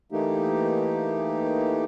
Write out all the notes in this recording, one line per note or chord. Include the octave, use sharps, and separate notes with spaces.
E3 A3 A#3 D#4 G4